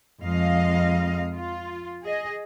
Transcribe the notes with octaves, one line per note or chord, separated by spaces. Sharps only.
F2 G#3 D#5 F5
F4
G#4 D#5